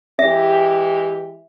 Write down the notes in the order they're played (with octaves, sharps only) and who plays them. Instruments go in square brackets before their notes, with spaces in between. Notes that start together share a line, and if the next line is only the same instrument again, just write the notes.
[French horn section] E3 G#3 G4 [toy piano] E5